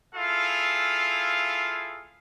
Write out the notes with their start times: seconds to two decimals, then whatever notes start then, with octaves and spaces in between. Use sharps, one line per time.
0.15 E4 F4 G#4 A4 F5